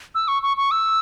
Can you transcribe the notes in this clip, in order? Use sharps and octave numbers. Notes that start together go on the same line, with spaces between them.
E6
C#6
C#6
C#6
E6